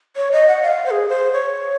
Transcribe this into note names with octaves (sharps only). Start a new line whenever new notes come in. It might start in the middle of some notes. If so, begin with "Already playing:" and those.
C#5
D#5
F#5
F5
C5
G#4
C5
C#5